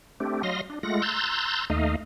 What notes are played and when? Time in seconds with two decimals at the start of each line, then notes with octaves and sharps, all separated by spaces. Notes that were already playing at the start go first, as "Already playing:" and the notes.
0.20 A3 C4 D4 G4
0.43 F#3 D#5 F5 C6 A#6
0.70 D4
0.83 G#3 A3 F4 F#5 A#6
1.02 A#5 C6 E6 F#6 G6 A6
1.70 D#2 A3 D#4 D#5 F5